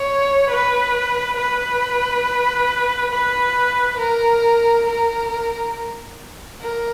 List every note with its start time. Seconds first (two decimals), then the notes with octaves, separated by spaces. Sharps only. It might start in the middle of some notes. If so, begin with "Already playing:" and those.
Already playing: C#5
0.50 B4
1.37 B4
3.12 B4
3.99 A#4
4.86 A#4
6.61 A#4